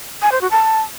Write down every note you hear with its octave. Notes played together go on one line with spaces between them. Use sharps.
G#5
C5
F#4
A5